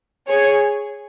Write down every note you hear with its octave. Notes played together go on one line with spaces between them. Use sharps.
G#4 C#5